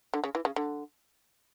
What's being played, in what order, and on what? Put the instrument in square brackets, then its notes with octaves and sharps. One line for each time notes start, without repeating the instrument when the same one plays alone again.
[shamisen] D3
C#3
E3
C#3
D3